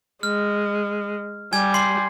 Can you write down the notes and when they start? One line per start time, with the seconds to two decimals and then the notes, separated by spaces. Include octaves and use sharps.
0.23 G#3 F6
1.52 G3 G#5 G#6
1.74 C6 C7